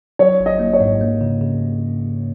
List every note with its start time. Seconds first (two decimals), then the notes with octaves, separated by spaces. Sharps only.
0.19 F#3 C#5
0.40 G#1
0.46 D#5
0.59 A#3
0.73 C#5
0.80 G#2
1.01 A#3
1.21 C#3
1.42 C#3